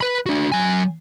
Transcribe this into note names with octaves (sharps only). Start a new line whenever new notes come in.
B4 B5
D4 F#4
F#3 G#5